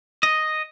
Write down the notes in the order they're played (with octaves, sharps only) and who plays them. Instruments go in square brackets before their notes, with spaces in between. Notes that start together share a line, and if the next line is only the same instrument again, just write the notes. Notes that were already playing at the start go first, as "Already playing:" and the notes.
[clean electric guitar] D#5